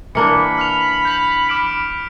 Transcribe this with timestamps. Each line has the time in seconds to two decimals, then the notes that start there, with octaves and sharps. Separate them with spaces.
0.15 E3 A#3 D4 B5 C#7
0.58 F6 B6 F7
1.05 G6 B6
1.49 D6 F6 D7